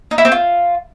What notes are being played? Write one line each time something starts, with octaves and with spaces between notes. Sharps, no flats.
D#4
E4
C4
F4